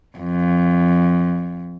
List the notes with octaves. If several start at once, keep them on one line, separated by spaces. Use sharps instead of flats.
F2